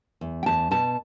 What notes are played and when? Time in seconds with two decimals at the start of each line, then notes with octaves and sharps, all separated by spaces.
0.21 E2
0.43 G5
0.46 E2 A5
0.71 B2 A5